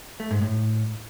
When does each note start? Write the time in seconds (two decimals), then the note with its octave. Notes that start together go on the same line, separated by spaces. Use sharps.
0.20 A3
0.31 G#2
0.41 A2